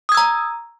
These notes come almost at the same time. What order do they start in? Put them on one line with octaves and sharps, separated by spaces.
D#6 G#6 E6 A#5